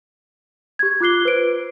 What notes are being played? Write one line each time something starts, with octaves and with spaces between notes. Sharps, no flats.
G4 G#6
F4 D6 F#6 C7 G7
B4 C5 D7